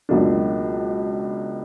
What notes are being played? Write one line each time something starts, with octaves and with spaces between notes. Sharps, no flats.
C#2 B2 F#3 A#3 D4